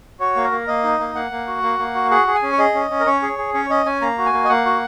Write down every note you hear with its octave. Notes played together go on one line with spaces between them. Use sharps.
F#4 C#5
A#3
A#4
A#3
A#3 D#5
D#4
A#3
A#3 F#5
A#3
F#4
A#3
A#3
F#4
G#4 F#5
G#4
G#5
C#4
C#5
G#4 D#5
C#4
C#4
A#4
C#4 C#5
G#4
G#4
C#4 C#5
C#4 D#5
C#4 G#5
A#3 A#5
F#4
G#5
A#3
D#5
A#3 F#5
F#4